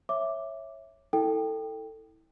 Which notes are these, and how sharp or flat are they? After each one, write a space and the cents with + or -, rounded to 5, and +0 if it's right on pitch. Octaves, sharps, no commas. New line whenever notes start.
C#5 -20 E5 +0 D6 +0
E4 -30 A4 +15 G5 +5